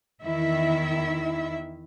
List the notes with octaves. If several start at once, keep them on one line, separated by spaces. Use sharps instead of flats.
E2 D#3 E4 E5